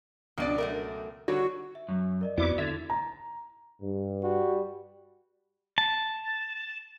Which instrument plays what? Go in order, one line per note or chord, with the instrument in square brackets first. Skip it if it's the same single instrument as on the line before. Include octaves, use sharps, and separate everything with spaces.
[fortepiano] C#2 B2 D5 [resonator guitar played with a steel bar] F3 D4
[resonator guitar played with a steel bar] F#2 A3 A#4
[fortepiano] D3 C#5 [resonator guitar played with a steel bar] G3 [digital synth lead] F#4
[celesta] E5
[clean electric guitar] F#2
[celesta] A#4 D5 D#5
[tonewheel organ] F2 E4 D6 [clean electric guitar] B3 [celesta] F#4 D5
[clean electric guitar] D3 [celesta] E4 G#6 A6 [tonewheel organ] E5
[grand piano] A#5
[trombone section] G2
[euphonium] G3 [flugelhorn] F#4
[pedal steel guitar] A5